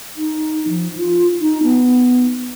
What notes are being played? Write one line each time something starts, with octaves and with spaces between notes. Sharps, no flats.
D#4
F3
F4
D#4
B3